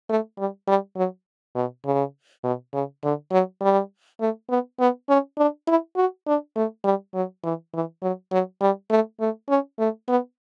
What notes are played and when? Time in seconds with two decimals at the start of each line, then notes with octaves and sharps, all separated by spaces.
0.09 A3
0.38 G3
0.67 G3
0.96 F#3
1.55 B2
1.85 C#3
2.43 B2
2.73 C#3
3.03 D3
3.32 F#3
3.61 G3
4.20 A3
4.49 B3
4.80 B3
5.09 C#4
5.38 D4
5.67 E4
5.96 F#4
6.27 D4
6.56 A3
6.84 G3
7.14 F#3
7.44 E3
7.74 E3
8.02 F#3
8.31 F#3
8.61 G3
8.90 A3
9.20 A3
9.49 C#4
9.79 A3
10.09 B3